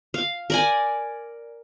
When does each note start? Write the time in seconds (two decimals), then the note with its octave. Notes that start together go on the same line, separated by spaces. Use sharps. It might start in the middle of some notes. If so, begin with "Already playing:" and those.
0.14 F5
0.50 A#4 D5 G#5